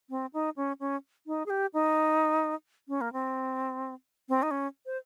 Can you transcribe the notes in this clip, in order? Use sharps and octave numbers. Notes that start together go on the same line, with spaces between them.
C4
D#4
C#4
C#4
D#4
G#4
G4
D#4
C#4
A#3
C4
C4
D#4
C#4
C5